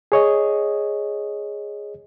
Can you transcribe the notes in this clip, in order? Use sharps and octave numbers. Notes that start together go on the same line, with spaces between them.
G#4 C#5 D#5